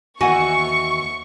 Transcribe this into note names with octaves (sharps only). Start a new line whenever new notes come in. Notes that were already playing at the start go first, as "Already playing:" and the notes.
D#2 E3 F#4 F#5 G#5 C#6